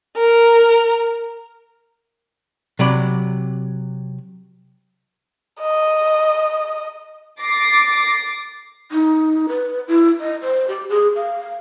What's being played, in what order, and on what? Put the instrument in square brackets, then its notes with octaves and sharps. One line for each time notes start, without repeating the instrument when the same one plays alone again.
[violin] A#4
[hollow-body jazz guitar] C3 F#3 D5 B5
[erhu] D#5
[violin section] D6 A6 A#6 C7
[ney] D#4
B4
E4
D#5
C5
G4
G#4
F5